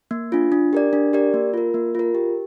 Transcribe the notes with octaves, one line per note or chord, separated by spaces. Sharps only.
A#3
D4 F4
D4
G4 A#4 D5
D4
G4 A#4 D5
A#3
F4 A#4
A#3
F4 A#4
G4